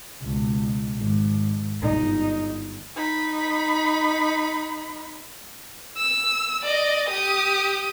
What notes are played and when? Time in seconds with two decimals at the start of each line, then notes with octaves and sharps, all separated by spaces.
0.21 C#2 B2
0.97 G#1
1.82 G1 D#4
2.96 D#4 B5
5.97 E6
6.62 D5 D#5
7.09 G4 D#6